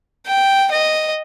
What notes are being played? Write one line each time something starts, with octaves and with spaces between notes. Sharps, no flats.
G5
D#5